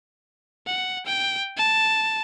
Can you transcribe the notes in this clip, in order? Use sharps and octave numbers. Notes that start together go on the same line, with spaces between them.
F#5
G5
A5